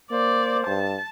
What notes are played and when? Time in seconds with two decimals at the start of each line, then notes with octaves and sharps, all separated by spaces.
0.11 A#3 C5 D5
0.67 G2 A5